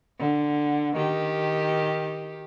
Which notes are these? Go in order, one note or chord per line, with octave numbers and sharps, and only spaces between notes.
D3
D#3 G4